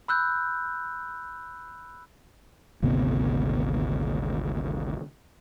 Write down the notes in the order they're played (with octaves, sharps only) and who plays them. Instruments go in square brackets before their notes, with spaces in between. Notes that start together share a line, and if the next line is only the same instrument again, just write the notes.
[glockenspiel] B5 E6 F#6 G6
[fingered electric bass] G#1 D2 C3 B3